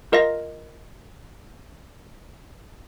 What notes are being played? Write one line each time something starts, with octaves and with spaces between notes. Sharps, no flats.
F4 A#4 D#5 F5 A#6